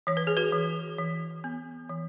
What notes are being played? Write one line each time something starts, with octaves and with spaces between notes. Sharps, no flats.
E3 C#5
B4
G#4
F#4 B4
E3
E3
B3
E3